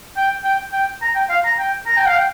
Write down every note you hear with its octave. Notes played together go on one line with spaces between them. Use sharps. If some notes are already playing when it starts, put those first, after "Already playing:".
G5
G5
G5
A#5
G5
F5
A#5
G5
A#5
G5
F5
G5